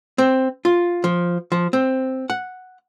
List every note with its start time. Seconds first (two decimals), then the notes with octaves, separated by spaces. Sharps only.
0.18 C4
0.65 F4
1.04 F3
1.52 F3
1.73 C4
2.30 F#5